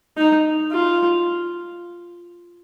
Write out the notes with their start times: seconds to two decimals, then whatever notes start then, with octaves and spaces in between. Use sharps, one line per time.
0.18 D#4
0.72 F4